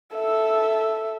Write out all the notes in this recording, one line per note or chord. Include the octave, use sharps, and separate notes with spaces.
A4 E5